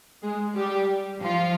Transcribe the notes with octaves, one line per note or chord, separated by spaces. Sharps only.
G#3 G#4
G3 G4
F3 F4